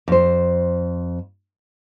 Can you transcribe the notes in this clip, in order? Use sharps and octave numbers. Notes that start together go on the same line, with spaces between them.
F2 C5